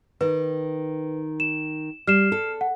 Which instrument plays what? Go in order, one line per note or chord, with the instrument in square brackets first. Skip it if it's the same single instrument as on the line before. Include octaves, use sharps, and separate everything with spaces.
[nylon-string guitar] D#3 [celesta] B4
[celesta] E7
[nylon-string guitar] G3 [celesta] F6 C7 E7
[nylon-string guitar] A4
[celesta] F#5